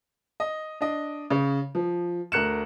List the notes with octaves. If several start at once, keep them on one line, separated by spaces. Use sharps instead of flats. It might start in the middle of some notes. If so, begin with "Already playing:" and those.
D#5
D4 D#5
C#3
F3
D2 A#4 F#6 C#7 E7